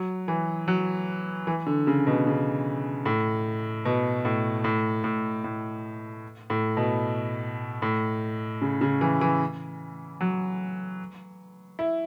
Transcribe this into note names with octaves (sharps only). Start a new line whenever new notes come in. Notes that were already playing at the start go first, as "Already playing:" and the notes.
Already playing: F#3
E3
F#3
E3
D3
C#3
B2
C#3
A2
B2
A2
A2
A2
A2
A2
B2
A2
C#3
C#3
E3
E3
F#3
E4